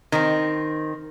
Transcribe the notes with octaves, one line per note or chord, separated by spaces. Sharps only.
D#3 C4